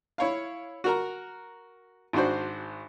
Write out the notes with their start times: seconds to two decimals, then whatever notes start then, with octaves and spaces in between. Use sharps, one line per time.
0.18 E4 C#5 F5
0.84 F#4 A#4 A#5
2.13 G#1 D4 F#4 C5